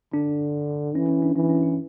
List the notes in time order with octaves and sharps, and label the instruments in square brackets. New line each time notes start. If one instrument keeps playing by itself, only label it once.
[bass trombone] D3 [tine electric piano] D4
[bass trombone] E3 [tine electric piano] C#4
[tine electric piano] C#4
D4
[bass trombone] E3 [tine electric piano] C#4
[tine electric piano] C#4
E4